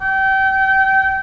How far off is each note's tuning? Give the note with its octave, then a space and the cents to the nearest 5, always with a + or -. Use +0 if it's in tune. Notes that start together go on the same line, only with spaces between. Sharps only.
G5 -30